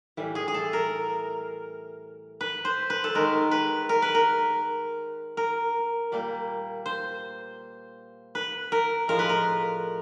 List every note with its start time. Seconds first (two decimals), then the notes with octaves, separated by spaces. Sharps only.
0.17 A2 E3 G3
0.35 G#4
0.48 G#4
0.54 A4
0.73 A#4
2.41 B4
2.65 C5
2.90 B4
3.04 A4
3.15 D#3 G#3 A#4
3.51 B4
3.89 A#4
4.02 B4
4.15 A#4
5.37 A#4
6.12 A#2 G3 A#3
6.86 C5
8.35 B4
8.72 A#4
9.08 A2 F3 G#3 A#4
9.19 B4
9.29 A#4